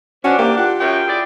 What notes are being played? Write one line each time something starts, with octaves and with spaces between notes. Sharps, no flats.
A2 E3 C#4 D4 F#4 C5
A#3 G4
F4 G4 F#5
F#2 G5
E4 G#4 D5